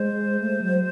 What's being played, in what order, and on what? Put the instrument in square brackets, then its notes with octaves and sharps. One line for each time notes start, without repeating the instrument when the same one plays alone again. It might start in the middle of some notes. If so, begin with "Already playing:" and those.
Already playing: [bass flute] G#3 [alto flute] C5
[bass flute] A3
F#3